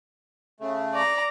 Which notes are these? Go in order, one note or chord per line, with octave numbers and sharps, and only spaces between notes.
C#3 A3
D5 A#5